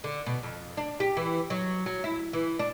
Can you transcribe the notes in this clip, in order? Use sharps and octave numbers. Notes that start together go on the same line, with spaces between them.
D3
B2
F2
D4
G4
E3
F#3
F#3
E4
E3
D4